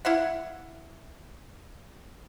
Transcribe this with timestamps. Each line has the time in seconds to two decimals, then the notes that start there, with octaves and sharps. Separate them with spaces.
0.05 E4 F5 F#5